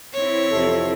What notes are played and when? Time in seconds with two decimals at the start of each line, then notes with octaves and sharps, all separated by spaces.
0.13 E3 C4 E4 C#5
0.51 F2 C3 A4